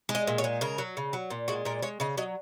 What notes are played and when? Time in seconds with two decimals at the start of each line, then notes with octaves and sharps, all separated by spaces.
0.09 G#3
0.15 D#5
0.27 A#2
0.38 C#5
0.44 G#3
0.61 C#3 A#4
0.78 F#3
0.97 C#3
1.13 F#3
1.30 A#2
1.48 G#3 F#4
1.65 A#2 A#4
1.83 G#3 C#5
2.00 C#3 D#5
2.17 F#3 D#5